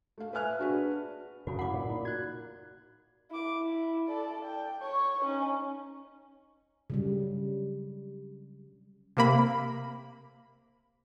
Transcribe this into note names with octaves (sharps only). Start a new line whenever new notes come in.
A3 F5
B4 E5 G#5 F6 F#6
D4 F#4 G#4 B4
F#2 C#3 F#4 B5
A2 F#5 B5 D6
A#2
D#4
F#4 F#6 G#6
E4 D6
E4
A4 D5
G5
C#5 C#6
C#4 D#4
C#3 F#3 G3
C3 A#3 B5